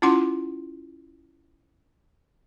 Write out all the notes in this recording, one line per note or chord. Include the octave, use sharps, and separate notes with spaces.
C#4 E4 F4 F#5 C6